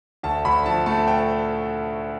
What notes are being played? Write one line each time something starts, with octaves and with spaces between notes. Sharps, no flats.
D2 A5
D2 B5
F3 A5
A3 A5
G5